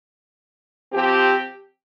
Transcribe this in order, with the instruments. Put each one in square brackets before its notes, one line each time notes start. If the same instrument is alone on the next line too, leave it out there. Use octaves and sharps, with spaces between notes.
[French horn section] F3 C4 G4